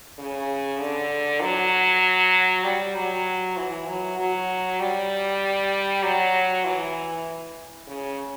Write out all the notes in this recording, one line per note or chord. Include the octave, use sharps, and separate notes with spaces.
C#3
D3
F#3
G3
F#3
E3
F#3
F#3
G3
F#3
E3
C#3